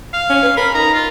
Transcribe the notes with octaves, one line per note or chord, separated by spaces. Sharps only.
F5
C#4
B4
A#4 B5
D#4 A#5
F4